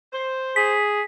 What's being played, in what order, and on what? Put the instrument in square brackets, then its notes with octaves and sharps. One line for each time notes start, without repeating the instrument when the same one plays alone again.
[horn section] C5
[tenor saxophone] G#4 [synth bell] B6